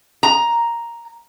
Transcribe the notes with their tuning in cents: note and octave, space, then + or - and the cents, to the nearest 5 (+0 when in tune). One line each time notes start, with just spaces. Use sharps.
A#5 +5